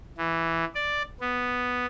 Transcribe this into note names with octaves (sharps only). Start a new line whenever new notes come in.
E3
D5
B3